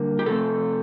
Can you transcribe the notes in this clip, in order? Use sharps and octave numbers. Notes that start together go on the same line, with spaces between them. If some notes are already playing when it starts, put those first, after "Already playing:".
Already playing: D3 G3 A#3
G4
C3 F3 A3 C4 A4